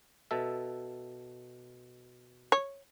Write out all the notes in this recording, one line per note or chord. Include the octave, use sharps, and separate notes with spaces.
B2 A4 E5
C#5